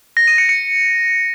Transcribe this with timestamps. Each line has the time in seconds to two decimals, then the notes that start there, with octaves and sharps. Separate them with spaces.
0.17 A#6
0.27 D#7
0.38 C#7
0.49 C#7